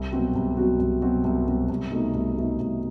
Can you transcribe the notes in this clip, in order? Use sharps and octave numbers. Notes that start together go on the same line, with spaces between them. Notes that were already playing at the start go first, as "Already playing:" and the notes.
Already playing: C2
B2 F#3 C4 F#4
C2
B2 F#3 C4 F#4
C2
B2 F#3 C4 F#4
C2
B2 F#3 C4 F#4
C2
B2 A3 D#4
C2
B2 A3 D#4
C2